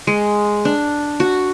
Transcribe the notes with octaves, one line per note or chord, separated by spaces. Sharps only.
G#3
D4
F#4